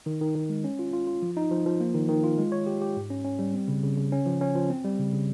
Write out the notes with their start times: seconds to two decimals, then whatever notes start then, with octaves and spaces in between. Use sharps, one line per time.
0.06 D#3
0.21 D#3
0.35 D#3
0.49 G#3
0.64 C#4
0.79 F4
0.93 F4
1.07 F4
1.22 F3
1.37 D#4
1.51 F3
1.66 F3
1.80 A#3
1.94 D#3
2.09 D#3
2.24 F4
2.38 G#3
2.52 C#5
2.67 G4
2.82 G4
2.96 G#2
3.11 C#4
3.24 C#4
3.39 G3
3.54 C4
3.68 C#3
3.83 C#3
3.98 C#3
4.12 C#4
4.26 F3
4.41 C#4
4.55 F3
4.70 C4
4.84 G3
4.99 C#3
5.13 C#3